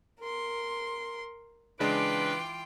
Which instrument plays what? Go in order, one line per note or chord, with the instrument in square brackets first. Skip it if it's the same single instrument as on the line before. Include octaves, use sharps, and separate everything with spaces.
[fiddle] A#4 C6
[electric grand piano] C#3 G#3 D4 [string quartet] E3 F4 G5 [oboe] B4 [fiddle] D6